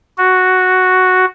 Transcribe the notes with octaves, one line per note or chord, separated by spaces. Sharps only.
F#4